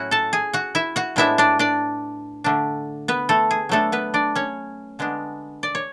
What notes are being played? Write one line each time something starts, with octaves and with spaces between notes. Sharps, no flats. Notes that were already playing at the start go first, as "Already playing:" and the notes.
Already playing: A2 F#3 C#4 E4 F#4 F#5
A4 A5
G#4 G#5
F#4 F#5
E4 E5
F#4 F#5
A2 G#3 B3 D4 E4 E5
D4 D5
D4 D5
D3 A3 D4
B3 B4
A3 A4
G#4
F#3 A3 B3 D4 A4
B3 B4
D4 D5
C#4 C#5
D3 G#3 B3 D4
D5
C#5